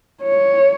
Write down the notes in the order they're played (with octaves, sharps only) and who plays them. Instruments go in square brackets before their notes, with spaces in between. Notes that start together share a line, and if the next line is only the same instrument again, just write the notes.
[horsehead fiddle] C#5